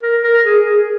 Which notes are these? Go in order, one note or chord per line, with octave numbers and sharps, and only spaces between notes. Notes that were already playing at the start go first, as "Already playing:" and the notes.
A#4
A#4
G#4
G#4